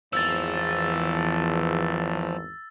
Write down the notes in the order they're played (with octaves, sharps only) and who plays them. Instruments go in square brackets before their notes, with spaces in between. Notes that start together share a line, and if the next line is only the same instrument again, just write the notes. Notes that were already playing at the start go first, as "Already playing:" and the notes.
[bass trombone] G#1 [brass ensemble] E2 [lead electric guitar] F3 [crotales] E6 A6